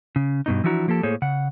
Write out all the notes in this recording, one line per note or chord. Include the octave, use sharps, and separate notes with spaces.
C#3
G2 B2 D#4
E3 F3 D4 E4 F#4 A#5
F3 A#3 G4 A4 A5
A2 A#3 G#4 A4 C5 C#5
C#3 F#5